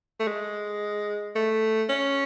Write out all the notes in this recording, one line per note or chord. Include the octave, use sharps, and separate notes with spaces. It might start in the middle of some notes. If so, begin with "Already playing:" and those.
A3
G#3
A3
C#4